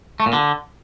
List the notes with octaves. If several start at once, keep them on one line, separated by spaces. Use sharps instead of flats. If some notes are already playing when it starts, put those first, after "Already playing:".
A3
A#2
D3